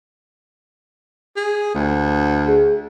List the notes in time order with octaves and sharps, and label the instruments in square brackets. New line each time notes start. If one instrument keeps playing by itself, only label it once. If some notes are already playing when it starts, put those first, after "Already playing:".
[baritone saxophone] G#4
D2
[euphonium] G#4